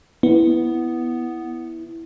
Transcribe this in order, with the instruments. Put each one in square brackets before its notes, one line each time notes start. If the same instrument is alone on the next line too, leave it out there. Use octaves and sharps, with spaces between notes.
[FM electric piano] B3 [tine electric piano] E4